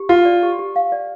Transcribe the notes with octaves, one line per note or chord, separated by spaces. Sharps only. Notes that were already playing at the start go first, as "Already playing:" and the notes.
Already playing: G4
F4 F5
D5
G4
G4
F5
D5